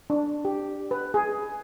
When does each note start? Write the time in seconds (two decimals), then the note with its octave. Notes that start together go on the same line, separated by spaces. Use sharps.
0.10 D4
0.45 G4
0.91 B4
1.14 G#4